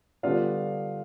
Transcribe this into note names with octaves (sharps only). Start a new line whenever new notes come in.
D3 G3 B3 D4 F4 F5